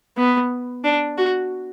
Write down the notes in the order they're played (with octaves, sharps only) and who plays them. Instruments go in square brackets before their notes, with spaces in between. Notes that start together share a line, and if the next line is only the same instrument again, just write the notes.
[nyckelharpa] B3
D4
F#4